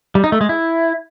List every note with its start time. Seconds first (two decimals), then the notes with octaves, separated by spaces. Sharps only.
0.15 G3
0.24 D#4
0.32 A3
0.41 G#3
0.49 E4